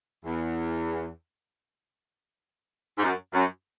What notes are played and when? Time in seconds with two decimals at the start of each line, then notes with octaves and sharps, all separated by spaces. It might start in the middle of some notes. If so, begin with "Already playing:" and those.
0.24 E2
2.98 G#2
3.02 F#2
3.33 F#2